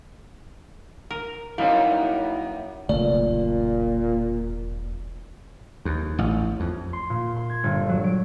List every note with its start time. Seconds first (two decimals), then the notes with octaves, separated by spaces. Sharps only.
1.11 A#4
1.58 F#2 G3 A#3 B3 C#4 D#4 E4
2.89 E1 B1 A#2 C#3 A3 D5
5.85 D#2
6.19 A1
6.60 F2
6.93 C6
7.10 A#2
7.36 C6
7.50 G#6
7.64 G1
7.89 F#3
8.04 D7